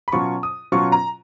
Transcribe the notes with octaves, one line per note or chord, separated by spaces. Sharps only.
B5
B2 F#3 C#4 F4 C#6
D#6
B2 F#3 C#4 F4 C#6
A#5